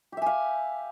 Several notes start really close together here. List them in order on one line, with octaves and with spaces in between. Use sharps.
G4 E5 G#5 F5